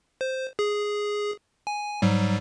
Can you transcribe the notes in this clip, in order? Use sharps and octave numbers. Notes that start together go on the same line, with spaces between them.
C5
G#4
G#5
G#2 F#3 G3